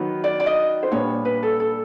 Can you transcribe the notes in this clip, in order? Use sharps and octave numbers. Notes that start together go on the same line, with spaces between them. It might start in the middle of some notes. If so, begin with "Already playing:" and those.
Already playing: D#3 F#3 B3
D5
D5
D#5
C5
A#2 G3 B3 D4 C#5
B4
A4
A4